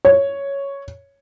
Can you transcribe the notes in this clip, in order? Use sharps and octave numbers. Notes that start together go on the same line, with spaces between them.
C#5